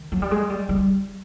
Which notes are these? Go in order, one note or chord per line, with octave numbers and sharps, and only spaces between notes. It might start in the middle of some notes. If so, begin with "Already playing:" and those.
Already playing: D#3
F#3
G3
G#3
G3
G3